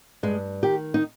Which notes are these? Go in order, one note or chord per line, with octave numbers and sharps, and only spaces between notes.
G2 G#3
D#3 G4
D#4